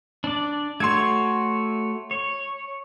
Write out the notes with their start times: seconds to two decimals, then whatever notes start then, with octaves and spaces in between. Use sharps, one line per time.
0.24 D4 D5
0.80 A3 F#4 C#5 C6 G#6
2.11 C#5